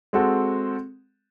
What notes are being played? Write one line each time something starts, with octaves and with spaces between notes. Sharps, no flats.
G#3 C4 F#4 A4